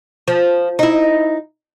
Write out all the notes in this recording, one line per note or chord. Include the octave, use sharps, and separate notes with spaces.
F3
D#4 E4